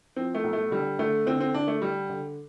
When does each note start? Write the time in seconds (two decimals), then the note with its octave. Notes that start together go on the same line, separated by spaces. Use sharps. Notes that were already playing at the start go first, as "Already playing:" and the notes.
0.16 F3 C4
0.35 A3
0.44 B1
0.53 A3
0.71 D3 G3
0.99 D3 A3
1.26 D3 C4
1.40 C4
1.54 D3 D4
1.68 A3
1.82 G3
2.09 D3